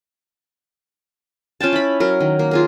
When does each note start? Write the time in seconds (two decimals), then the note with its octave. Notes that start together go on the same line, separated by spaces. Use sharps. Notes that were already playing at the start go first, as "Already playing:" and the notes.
1.60 C#4 F4 G5 A5
1.73 E4 B5
2.00 F#3 A#4
2.20 D#3
2.39 A#3
2.51 F4 G#4 A#4